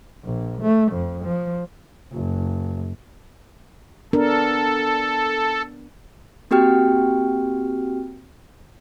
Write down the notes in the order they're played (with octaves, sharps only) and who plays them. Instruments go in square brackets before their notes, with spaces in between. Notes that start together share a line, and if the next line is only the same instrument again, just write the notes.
[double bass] A#1
A3
F2
F3
F#1
[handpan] B3 D4 A#4 [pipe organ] A4
[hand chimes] A#3 C4 F#4 G4 G5 F6